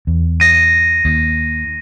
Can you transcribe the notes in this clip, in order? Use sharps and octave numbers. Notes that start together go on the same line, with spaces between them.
E2
A#6 D#7
D#2